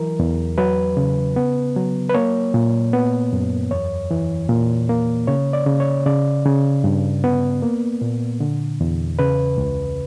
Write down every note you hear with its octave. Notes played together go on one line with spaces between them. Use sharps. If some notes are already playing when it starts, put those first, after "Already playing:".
Already playing: E3 F#3 A#4
E2
F#3 B4
C#3
B3
F#3
B4
A#3 C#5
A#2
B3
F#2
E2 C#5
E3
A#2
A#3
C#3 C#5
D5
C#3
C#5
C#3 D5
C#3
G2
B3
A#3
A#2
D3
E2
C#3 B4
C#2